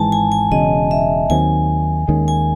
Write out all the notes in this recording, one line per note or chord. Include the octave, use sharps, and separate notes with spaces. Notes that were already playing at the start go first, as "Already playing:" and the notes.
Already playing: G#1 G#2 E3 G#3 G#5 A5
G#5
G#5
E1 E2 C#3 F#3 D#5
E5
D#2 D#3 F#3 C4 G#5
D#2 D#3 G#3 C#4
G#5